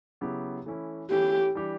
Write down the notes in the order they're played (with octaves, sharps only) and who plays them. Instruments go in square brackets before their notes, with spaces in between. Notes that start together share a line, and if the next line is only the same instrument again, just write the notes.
[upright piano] C#3 F#3 B3 E4 G4
E3 A3 C#4 E4
[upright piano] E3 A3 C#4 E4 [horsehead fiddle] G4
[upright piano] E3 G3 D4 G4